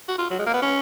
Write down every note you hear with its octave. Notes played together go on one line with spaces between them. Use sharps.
F#4
F4
F#3
G#3
A#3
B3
C#4